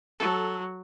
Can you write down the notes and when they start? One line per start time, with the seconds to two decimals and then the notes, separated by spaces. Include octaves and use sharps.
0.20 F#3 A4